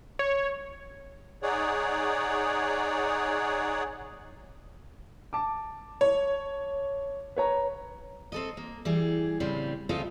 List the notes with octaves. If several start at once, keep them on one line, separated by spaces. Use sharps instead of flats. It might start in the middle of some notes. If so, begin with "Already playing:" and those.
C#5
D#4 G#4 C#5 D5 F#5
A5 D6
C#5
B4 C#5 A#5
C4 A4 D#5
A#3
E3 G3 G#4
A2 C#3 G3 C4
D2 C#3 C4 F4 A4 D#5